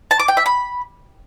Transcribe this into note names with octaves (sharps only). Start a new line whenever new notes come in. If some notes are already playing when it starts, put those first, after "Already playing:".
A5
D6
G5
E5
B5